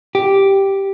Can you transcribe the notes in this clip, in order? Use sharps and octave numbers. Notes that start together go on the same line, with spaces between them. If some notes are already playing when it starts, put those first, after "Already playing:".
G4